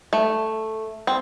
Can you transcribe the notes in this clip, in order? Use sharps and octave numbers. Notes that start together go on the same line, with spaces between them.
A3
C4